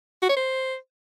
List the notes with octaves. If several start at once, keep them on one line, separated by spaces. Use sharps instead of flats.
F#4
C#5
C5